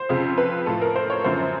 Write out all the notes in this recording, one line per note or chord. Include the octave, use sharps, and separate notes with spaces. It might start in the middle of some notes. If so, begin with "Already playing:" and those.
Already playing: C5
F2 C#3 F3
B4
A2 F3 A4
A#4
C5
C#5
F#2 D3 F3 C5